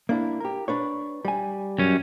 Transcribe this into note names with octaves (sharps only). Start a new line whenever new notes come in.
A#3 D4 E4
G4 A#4
D4 B4 C#5
G3 G#5
F#2 C#4